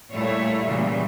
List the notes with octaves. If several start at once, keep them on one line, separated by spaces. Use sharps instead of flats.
A#2 G3 A3 E4 C#5
A#2 C#3 E3 F#3 G3